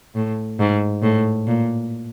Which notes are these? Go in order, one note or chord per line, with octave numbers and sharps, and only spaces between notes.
A2
G#2
A2
A#2